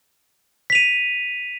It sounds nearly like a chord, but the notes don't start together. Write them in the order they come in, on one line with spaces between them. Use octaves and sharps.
B6 F7 D#7